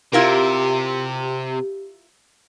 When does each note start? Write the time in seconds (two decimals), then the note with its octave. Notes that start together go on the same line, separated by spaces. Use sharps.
0.13 C3 E4 F4 G4 A#4